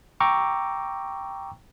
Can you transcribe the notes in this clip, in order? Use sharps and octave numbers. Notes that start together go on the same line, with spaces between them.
G5 A#5 C#6 D6 E6